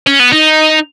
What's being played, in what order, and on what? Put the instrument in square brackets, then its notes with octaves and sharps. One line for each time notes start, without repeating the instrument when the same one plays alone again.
[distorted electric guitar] C#4
B3
D#4